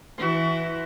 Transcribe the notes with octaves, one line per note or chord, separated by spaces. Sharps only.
E3 E4 F#4 C6